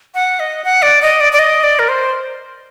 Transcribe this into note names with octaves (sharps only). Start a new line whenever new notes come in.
F#5
D#5
F#5
D5
D#5
D5
D5
D#5
D5
A#4
C5